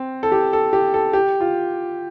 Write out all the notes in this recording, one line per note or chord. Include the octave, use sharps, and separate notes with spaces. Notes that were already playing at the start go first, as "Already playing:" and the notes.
Already playing: C4
A4
G4
A4
G4
A4
G4
F4